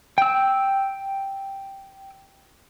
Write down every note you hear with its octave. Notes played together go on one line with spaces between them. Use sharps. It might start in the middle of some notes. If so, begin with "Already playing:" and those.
G5 E6